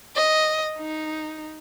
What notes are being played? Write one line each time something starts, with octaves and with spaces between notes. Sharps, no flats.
D#5
D#4